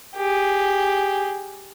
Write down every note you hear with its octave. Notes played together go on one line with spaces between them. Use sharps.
G4 G#4